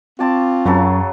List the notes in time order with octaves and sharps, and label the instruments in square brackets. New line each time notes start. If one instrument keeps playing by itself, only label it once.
[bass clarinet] C4 [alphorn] F4 [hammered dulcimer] D5 A5 C#6
[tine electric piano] F#2 [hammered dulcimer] C#3 F#3 A4